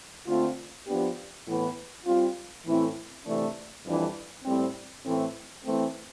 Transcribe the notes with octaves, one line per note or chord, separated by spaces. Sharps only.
D3 A3 C4 F4
F3 B3 D4 G4
A2 E3 B3
G3 C4 F4
A2 E3 A3 C4 E4
C3 E3 A3 D4
F2 E3 G3 D4 A4
A2 G3 C4
A2 E3 A3 C4
E3 A3 C4